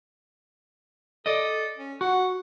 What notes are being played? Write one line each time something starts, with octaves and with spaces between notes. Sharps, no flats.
A4 D5 D#5
C#4
F#4 F#5